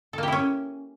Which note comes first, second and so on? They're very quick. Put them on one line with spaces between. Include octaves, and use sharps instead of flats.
A4 A#3 G4 E4 C#4